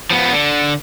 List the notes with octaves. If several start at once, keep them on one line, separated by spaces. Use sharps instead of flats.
F3 B3
D3